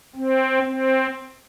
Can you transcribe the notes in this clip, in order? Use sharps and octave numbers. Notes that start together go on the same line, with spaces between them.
C4
C4